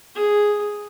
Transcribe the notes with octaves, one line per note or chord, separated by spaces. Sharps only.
G#4